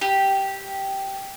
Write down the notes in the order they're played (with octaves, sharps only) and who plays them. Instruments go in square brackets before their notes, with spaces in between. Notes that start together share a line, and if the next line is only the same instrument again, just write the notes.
[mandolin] G4